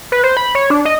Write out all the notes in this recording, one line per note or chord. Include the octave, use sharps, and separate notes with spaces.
B4
C5
B5
C#5
D4
D#5